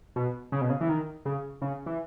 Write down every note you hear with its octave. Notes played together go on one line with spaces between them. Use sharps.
B2
C#3
B2
C#3
E3
D#3
C#3
C#3
E3